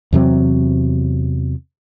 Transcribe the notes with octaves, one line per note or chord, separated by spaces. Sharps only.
E2 C3 F#3 C4